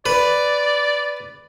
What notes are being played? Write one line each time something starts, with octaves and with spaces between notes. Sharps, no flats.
B4 D5